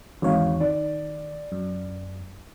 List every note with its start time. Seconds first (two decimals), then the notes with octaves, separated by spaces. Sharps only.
0.22 G#1 E2 C#5 F5
0.60 D#3 D5
1.52 F#2